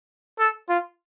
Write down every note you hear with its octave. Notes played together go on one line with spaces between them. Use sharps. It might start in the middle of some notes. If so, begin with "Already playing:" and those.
A4
F4